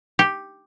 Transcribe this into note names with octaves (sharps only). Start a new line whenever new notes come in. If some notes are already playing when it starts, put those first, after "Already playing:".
G4